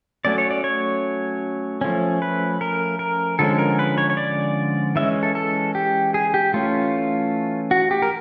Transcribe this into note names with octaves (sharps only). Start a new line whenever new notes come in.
F#3 A3 C#4 D5
C#5
D5
C#5
F3 A3 C#4
B4
A#4
A#4
D3 F3 G#3 C#4 A4
A#4
B4
C#5
C#5
D5
E3 G#3 C#4 E5
A4
A4
G4
G#4
G4
E3 A3 C#4 F4
F#4
G4
A#4